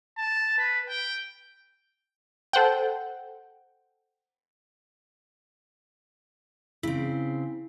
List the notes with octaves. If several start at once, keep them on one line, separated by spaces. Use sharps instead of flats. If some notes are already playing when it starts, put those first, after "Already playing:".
A5
B4
G5
A4 C5 F#5 G5
C#3 C4 E4